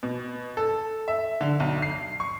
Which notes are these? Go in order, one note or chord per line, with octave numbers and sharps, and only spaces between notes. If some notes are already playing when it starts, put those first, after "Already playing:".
B2
A4
E5
D3
B1
C7
C#6